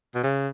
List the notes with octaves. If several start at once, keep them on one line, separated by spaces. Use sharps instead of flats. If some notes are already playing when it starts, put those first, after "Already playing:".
B2
C#3